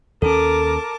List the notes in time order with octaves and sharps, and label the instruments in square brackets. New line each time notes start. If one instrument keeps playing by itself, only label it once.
[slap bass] D#2 C#4 [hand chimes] A4 [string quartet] A#4 A5 D6